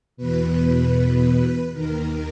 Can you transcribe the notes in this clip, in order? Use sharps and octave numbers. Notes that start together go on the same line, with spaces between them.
E2 B2 B4
D#2 D#3 A#4